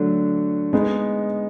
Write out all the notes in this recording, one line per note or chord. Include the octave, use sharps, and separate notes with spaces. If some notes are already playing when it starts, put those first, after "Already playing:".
Already playing: D3 F#3 A3 D4
G#3 B3 D#4